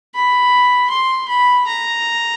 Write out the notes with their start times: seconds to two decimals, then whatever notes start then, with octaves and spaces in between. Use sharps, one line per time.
0.15 B5
0.90 C6
1.29 B5
1.67 A#5